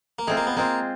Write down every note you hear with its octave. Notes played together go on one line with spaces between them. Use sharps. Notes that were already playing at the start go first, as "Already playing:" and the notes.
A#3
G#3 A3 C4 F4
A#3
B3
G#3 A#3 C4 F4